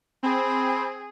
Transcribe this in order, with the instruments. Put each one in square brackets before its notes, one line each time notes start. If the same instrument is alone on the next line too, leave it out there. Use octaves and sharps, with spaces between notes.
[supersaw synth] C4 [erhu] G#4 [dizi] B5